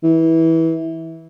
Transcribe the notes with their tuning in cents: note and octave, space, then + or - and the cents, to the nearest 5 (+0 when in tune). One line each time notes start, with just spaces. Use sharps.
E3 -20